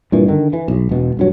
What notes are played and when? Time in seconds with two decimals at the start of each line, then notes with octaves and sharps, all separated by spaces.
0.12 G2 A#2 E3
0.28 D3 D#3
0.53 E3
0.68 B1
0.89 E1 B2
1.17 D#1 G2 F#3